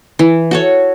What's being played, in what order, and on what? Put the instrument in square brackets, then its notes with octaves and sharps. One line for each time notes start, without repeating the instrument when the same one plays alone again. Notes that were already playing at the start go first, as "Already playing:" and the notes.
[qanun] E3
F#4 A4 C#5